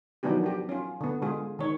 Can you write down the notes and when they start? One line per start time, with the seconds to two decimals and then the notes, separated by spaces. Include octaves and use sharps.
0.23 D#3 F3 F#3 B3 D4 G4
0.44 D4 G4
0.69 C#4 F4
1.01 D3 B3
1.22 D3 G#3 F4 G#4
1.59 D#3 C#5